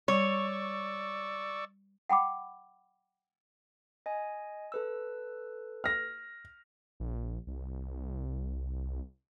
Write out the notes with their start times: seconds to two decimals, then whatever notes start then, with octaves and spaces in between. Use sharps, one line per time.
0.08 G3 C#5 D5 C#6 E6
2.10 F#5 G5 B5 D6
4.06 D#5 G#5
4.72 A4 B4 E6
5.84 F6 A#6
7.00 A#1
7.47 C2